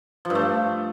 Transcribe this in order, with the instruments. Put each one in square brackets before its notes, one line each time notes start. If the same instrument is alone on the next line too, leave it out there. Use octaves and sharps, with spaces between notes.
[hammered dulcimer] F3
G2
A3